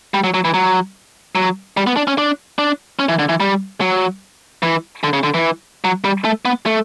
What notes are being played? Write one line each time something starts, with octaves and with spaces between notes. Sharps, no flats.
G3
F#3
F#3
E3
F#3
F#3
G3
B3
D4
C#4
D4
D4
C#4
E3
D3
E3
G3
F#3
E3
D3
C#3
D3
E3
F#3
G3
A3
B3
A3